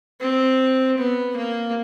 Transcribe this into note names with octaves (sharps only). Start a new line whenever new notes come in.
C4
B3
A#3